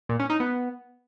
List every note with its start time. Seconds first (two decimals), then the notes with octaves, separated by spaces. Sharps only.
0.09 A#2
0.19 C#4
0.30 D#4
0.40 B3